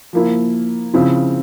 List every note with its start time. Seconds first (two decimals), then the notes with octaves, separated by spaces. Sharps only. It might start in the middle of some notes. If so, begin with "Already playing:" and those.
0.13 F3 A#3 E4
0.94 C#3 F3 C4 E4